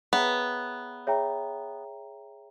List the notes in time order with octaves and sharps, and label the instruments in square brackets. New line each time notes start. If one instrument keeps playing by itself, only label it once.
[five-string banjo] B3 [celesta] G#4 C#5 E5 G5 A#5
[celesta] G#4 C#5 E5 G5 A#5